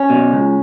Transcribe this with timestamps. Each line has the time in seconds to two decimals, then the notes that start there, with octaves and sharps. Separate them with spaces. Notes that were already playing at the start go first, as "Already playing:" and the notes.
Already playing: C#4
0.10 B2
0.33 C#2